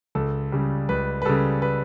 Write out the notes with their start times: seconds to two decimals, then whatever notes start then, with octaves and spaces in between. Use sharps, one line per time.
0.15 C#2 A4
0.52 C#3 G3
0.89 C#2 B4
1.22 B4
1.25 C#3 G3 A4
1.62 B4